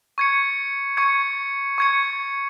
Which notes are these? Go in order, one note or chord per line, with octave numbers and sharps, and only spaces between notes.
C#6 G#6 C#7
C#6 G#6 C#7
C#6 G#6 C#7